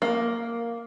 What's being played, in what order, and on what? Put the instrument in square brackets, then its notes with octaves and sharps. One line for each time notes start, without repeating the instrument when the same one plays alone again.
[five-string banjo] A#3